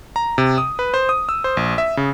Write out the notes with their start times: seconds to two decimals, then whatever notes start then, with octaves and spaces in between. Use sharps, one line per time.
0.16 A#5
0.38 C3
0.58 D#6
0.79 B4
0.94 C5
1.09 D#6
1.29 E6
1.44 C5
1.57 A#1
1.78 E5
1.97 C#3